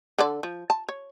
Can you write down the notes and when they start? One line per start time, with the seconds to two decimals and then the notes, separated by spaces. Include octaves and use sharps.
0.18 D3 A4 D5
0.43 F3
0.70 A5
0.89 C#5